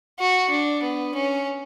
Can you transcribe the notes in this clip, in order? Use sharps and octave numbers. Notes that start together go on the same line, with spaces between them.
F#4
D4
B3
C#4